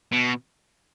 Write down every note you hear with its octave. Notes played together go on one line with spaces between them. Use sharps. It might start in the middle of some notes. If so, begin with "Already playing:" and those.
B2